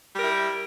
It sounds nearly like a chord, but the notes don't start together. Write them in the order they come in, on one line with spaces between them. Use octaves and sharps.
G3 A#4 E4